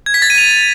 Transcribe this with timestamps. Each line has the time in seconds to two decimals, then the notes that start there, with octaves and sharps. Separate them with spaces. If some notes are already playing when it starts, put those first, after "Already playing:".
0.06 G#6
0.14 B6
0.22 A6
0.30 D#7
0.38 F7